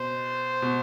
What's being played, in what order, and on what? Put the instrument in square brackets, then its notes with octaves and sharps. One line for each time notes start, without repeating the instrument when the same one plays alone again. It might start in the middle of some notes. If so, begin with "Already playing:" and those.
Already playing: [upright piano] B2 [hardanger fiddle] C5
[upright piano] B2